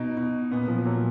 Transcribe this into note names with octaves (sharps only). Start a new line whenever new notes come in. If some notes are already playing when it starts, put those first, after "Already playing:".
Already playing: B2 D#4
B2
A#2 B3
F3
A#2 F#3